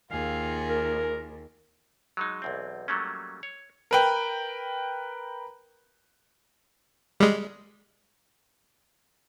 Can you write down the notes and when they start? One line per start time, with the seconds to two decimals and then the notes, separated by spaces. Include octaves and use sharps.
0.11 D#2 F4 G#4 F5
0.69 A#4
2.17 F#3 G#3 D#4
2.42 B1 E2 C4
2.88 F#3 G3 A3 A#3 C#4
3.43 C#5
3.91 A#4 B4 G5
7.20 G3 G#3